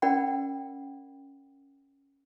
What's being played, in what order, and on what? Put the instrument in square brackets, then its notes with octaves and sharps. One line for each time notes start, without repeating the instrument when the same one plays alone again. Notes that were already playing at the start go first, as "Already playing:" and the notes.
[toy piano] C#4 A#4 D5 F#5 G5 B5